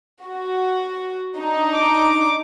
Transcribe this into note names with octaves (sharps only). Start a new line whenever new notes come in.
F#4
D4 D#4
D6